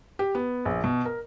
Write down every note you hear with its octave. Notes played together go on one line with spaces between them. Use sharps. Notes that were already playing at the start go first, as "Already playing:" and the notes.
G4
B3
A#1
B2
A#4